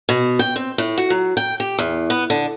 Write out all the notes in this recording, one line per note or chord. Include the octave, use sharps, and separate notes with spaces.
B2
G5
C4
A2
F#4
F#3
G5
G4
E2
B3
D3